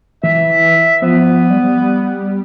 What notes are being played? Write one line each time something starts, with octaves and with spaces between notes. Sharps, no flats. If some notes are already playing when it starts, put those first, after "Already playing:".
E3 E5
F3 B3
G3